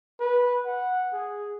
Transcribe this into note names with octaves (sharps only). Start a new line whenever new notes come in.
B4
F#5
G#4